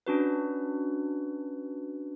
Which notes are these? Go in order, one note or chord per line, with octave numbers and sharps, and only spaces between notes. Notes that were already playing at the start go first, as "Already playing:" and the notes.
C#4 D4 F#4 B4